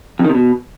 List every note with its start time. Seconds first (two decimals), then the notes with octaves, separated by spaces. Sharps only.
0.19 F2
0.24 D#3
0.30 C3
0.35 B2